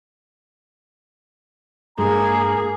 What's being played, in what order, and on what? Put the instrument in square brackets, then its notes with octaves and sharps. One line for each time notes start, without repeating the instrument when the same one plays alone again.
[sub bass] G2 [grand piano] G#3 [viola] A#3 G#4 [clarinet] A#5